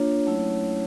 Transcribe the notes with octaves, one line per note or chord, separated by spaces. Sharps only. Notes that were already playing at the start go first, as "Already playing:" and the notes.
Already playing: A#3 D4 F4 C#5
F#3 A3 C#4 E4